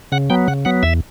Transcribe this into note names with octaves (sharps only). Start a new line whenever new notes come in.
C#3 F#5
F#3 B3 G5
C#3 F#5
F#3 B3 F#5
E2 E5